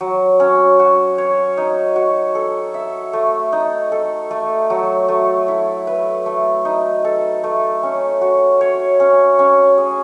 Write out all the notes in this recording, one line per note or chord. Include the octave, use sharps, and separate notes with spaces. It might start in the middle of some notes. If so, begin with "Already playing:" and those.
F#3
C#4
F#4
C#5
D#4
F#4
A4
E5
A3
D#4
A4
A3
F#3
A3
E4
B4
A3
D#4
A4
A3
C#4
F#4
C#5
C#4
C#4
G#4